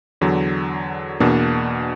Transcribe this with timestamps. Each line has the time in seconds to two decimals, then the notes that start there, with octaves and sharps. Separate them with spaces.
0.21 E2 D3 F#3
1.20 E2 B2 A#3 D4